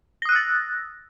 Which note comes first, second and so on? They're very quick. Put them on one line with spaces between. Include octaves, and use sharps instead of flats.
A#6 D#6 F#6 E6 A6